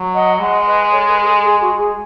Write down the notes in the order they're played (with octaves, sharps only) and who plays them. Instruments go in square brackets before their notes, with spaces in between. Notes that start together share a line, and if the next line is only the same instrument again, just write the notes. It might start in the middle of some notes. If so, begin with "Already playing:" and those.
Already playing: [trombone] F#3
[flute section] D#5 F#5
[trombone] G#3 [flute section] D#5 F#5
[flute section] B4 D#5
A4 C#5
B4
G#4
A4
G#4
F#4
G#4